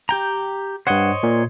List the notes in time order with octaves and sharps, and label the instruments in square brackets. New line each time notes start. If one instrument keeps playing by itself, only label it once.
[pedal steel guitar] G4 G5 A#5
[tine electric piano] G2 F#5 [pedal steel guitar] C5 C#5 D#5
[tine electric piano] A#2